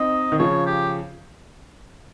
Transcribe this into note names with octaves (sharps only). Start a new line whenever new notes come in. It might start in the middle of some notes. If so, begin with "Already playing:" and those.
Already playing: C4 D#4 D#5
D#3
C#3 F3 C#5
G4